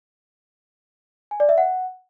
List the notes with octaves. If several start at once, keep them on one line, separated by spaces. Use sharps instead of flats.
G#5
D5
E5
F#5